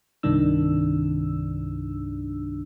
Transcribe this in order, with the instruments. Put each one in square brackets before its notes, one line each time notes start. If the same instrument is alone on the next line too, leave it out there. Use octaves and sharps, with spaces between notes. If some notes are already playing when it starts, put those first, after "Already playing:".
[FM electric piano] C2 G2 C3 D#3 D4 E6